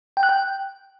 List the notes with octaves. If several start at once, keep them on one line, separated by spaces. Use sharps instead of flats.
G5
F#6
G5